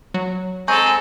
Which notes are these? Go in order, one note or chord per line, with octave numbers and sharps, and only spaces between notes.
F#3
G#3 C4 G#4 A4 G#5 A#5 C#6 G6